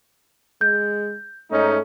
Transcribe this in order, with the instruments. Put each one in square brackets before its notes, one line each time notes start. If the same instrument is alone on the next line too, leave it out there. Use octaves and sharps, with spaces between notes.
[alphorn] G#3 [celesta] G6
[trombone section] G#2 C#4 D#4 [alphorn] A3